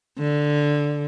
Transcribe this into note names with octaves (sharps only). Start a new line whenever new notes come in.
D3